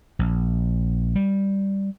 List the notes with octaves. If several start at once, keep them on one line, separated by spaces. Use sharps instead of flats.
A#1
G3